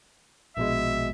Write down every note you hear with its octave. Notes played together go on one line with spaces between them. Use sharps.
A#1 B2 G#3 E5